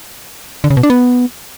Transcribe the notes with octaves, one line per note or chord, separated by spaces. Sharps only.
D3
C#3
B2
D4
B3